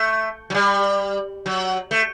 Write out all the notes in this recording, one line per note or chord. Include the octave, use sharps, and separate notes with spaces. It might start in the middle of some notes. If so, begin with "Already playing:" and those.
Already playing: A3
F#3
G3
F#3
A3